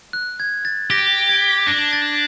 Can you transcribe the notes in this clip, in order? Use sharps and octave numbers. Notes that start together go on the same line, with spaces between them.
F#6
G#6
A6
G4 A#6
G#6
D4 A#6
A6